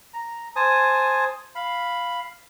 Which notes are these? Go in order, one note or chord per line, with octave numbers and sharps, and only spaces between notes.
A#5
C5 G#5 A5 D#6
F5 B5